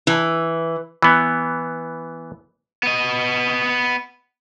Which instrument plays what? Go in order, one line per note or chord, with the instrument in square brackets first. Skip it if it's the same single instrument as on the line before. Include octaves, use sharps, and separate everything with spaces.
[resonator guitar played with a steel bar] E3
[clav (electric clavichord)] E3 B3
[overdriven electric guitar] B3 D#5